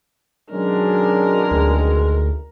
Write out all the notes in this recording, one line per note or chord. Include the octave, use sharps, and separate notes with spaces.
B2 D#3 F#3 G#3 C#4 D4 A#4
D2